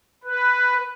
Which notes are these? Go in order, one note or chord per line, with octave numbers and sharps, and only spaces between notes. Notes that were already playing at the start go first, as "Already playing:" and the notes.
B4